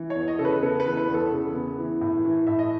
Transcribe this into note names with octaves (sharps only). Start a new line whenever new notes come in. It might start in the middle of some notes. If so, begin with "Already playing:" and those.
Already playing: E3
C#5
E2
D#5
C#3 A4
B4
B3 A4
B4
E3
B4
E2
A4
C#3
B3
E3
A2
E3
A2 E5
D#5